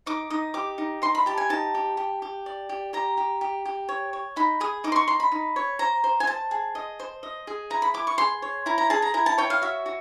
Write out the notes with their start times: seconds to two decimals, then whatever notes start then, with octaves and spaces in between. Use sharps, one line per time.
0.06 D#4 D6
0.30 D#4 D#6
0.54 G4 D6
0.78 D#4
1.02 D#4 C6
1.15 B5
1.26 G4 A5
1.38 G#5
1.49 D#4 A5
1.75 G4
1.97 G4
2.22 G4
2.46 D5
2.69 G4
2.93 G4 A#5
3.17 G4
3.41 G4
3.66 G4
3.89 C#5
4.13 C#5
4.36 D#4 B5
4.60 G#4 D#6
4.84 D#4 D6
4.92 C6
4.96 C#6
5.08 D#4 C6
5.20 B5
5.32 D#4
5.56 C#5
5.79 C5 A#5
6.04 C5
6.20 G#5
6.27 C5 A5
6.51 G#4
6.75 D#5
7.00 C5
7.23 D#5
7.47 G#4
7.70 E4 A#5
7.82 B5
7.94 E4 D6
8.07 C#6
8.18 G#4 C6
8.42 C#5
8.66 E4 A#5
8.78 A#5
8.90 G#4 A5
9.02 A#5
9.14 E4 A#5
9.26 A5
9.38 C#5 G5
9.50 F5
9.62 F#4 E5
9.86 F#4